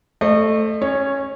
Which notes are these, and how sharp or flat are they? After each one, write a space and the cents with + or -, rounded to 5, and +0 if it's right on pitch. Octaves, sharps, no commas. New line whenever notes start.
A3 +0 C5 +25 D#5 -35
C#4 -15 C#5 +0